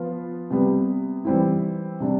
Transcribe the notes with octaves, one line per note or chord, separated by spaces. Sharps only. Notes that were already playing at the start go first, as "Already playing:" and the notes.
Already playing: F3 B3 F4
C3 G3 B3
E3 G3 C4 E4
C3 G3 D4